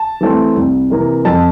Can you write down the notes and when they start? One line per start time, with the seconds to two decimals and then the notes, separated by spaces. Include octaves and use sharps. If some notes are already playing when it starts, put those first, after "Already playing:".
Already playing: A5
0.21 E3 A3 C4
0.56 C2
0.90 C3 E3 A#3
1.25 F2 A5